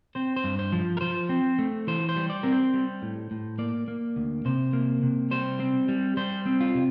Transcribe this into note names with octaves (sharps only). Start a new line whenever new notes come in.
C4 C5
C5
G2
C5
F3
A#4
F3 C5
C4
A3
E3 C5
C5
G3
D5
C4 A#4
C5
G3
A2
A2
A#3 D5
A#3
D2
C3 C5
A#3
C3
G3 C5
C4
G3
G3 C5
C4
F4
C3